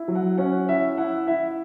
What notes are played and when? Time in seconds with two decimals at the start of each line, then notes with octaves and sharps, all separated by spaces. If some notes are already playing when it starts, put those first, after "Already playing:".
Already playing: E4
0.08 F#3
0.15 F#5
0.38 C#4 F#5
0.69 E4 E5
0.97 E4 F#5
1.27 E4 E5